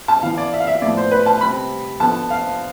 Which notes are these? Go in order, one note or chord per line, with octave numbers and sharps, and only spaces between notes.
A5
E3 B3 F5
D5
E5
F5
E5
A2 F3 B3 D5
C5
B4
A5
C3 G3 C4 B5
D3 F3 B3 A5
F5